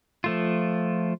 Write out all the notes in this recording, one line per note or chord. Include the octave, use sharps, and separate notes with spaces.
F3 A3 F4